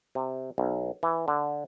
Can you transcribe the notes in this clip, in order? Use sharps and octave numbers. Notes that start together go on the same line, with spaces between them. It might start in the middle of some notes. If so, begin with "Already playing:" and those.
C3
B1
E3
D3